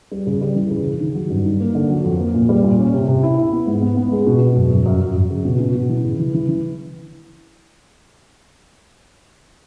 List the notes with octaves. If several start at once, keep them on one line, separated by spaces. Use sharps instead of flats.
G3
C#3
G3
E3
C#3
C#3
D#3
F#3
G2
D#4
A#3
D3
F#3
F2
A#3
A#2
G3
A#2
C#4
C3
C3
E4
E4
B3
G#2
B3
B3
G#3
B2
B2
F#2
F#2
F#2
F#2
F#2
C#3
B2
B2
B2
E3
C#3
E3
E3
E3